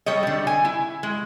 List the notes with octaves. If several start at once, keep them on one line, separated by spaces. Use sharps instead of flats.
G3 A4 C#5 D#5
D3 G3
G#5
E4
G#3